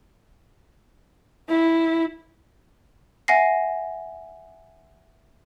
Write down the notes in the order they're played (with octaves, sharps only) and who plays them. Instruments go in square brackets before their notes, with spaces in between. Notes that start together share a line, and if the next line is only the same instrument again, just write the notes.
[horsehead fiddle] E4
[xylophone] E5 F#5 G#5 A#6 C7